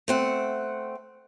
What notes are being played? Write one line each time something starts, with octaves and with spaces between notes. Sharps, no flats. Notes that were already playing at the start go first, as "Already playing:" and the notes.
A3 C4 F#5